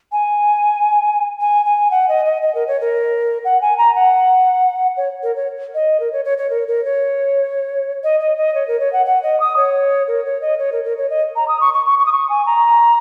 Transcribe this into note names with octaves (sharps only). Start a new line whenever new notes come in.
G#5
G#5
G#5
F#5
D#5
D#5
D#5
A#4
C#5
A#4
F#5
G#5
A#5
F#5
C#5
A#4
C#5
D#5
A#4
C#5
C#5
C#5
A#4
A#4
C#5
D#5
D#5
D#5
C#5
A#4
C#5
F#5
F#5
D#5
D#6
C#5
A#4
C#5
D#5
C#5
A#4
A#4
C#5
D#5
A#5
D#6
C#6
C#6
C#6
C#6
D#6
C#6
G#5
A#5